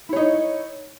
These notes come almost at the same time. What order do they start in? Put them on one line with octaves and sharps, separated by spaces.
E4 C#5 D#4